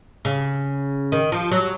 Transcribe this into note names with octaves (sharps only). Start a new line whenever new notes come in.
C#3
D#3
F3
F#3